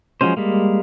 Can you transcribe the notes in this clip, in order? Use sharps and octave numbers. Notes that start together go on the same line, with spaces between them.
F3 F#3 G#3 C#4 C5
G3 G#3 A#3